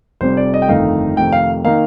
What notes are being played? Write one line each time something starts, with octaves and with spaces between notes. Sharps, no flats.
F1 F2 C3 G3 C5
D5
D#5
G5
G1 F2 D#3 A3 D#4 F5
F2 C3 D#3 A3 G5
F5
D#3 A#3 D#4 F5